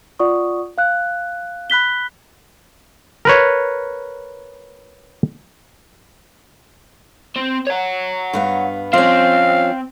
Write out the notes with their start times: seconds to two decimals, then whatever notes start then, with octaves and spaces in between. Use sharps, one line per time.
0.19 F4 D5 F#5 C#6 D#6
0.78 F5 F#6
1.70 B5 F#6 B6 G7
3.25 A#4 B4 C#5
7.36 C4
7.67 C#5 F#5
8.33 G2 B3 F5
8.93 F3 C4 C#4 F5